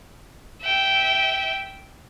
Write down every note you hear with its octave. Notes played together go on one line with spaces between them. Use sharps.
E5 G5